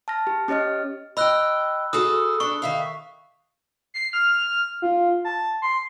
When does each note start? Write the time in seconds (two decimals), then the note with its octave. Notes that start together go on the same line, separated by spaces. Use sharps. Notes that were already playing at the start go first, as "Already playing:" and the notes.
0.08 A5 F6 A#6
0.27 G4
0.48 C#4 G4 C#5 D#5 F6
1.17 D#5 G5 B5 E6 F#6
1.93 F#4 G#4 A4 D#6
2.40 D4 A4 C#6
2.62 D#3 E5 F5
3.94 C7
4.13 F6
4.82 F4
5.25 A5
5.62 C6